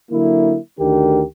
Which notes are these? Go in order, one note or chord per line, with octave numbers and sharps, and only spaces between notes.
D3 F#3 A#3 E4
D2 D#3 D4 G4 A#4